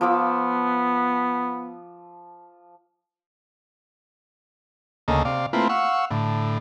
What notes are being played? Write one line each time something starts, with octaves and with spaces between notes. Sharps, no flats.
F3 B3 D6 E6
D2 C#3 A#3 A4 D#5
C3 D5 F5
A3 A#3 C4 E4 F4 B4
F5 F#5 C#6 E6
A2 D3